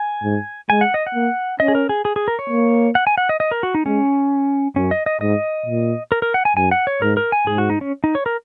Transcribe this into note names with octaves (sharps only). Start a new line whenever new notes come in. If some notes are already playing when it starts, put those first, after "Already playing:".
Already playing: G#5
G#2
G#3 G#5
F#5
D#5
F#5
A#3
C#4 D#5
G#4
A#4
G#4
G#4
G#4
A#4
C#5
A#3
F#5
G#5
F#5
D#5
D#5
A#4
F#4
D#4
G#3 C#4
F#2 C#4
D#5
D#5
G#2 D#5
A#2
A#4
A#4
F#5
G#5
F#2 G#5
F#5
C#5
G#2 A#4
A#4
G#5
G#2 G#4
F#4
D#4
C#4
D#4
C#5
A#4